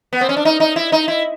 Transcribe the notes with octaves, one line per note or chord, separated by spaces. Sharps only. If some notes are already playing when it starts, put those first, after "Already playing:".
B3
C4
C#4
D4
D#4
D#4
E4
D#4
E4